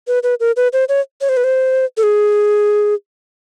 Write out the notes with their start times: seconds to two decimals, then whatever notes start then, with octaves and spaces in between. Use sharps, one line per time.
0.08 B4
0.23 B4
0.40 A#4
0.56 B4
0.73 C5
0.89 C#5
1.21 C#5
1.29 C5
1.37 B4
1.44 C5
1.97 A4
2.03 G#4